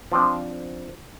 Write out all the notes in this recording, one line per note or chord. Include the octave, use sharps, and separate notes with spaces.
F3 C4 D4 C5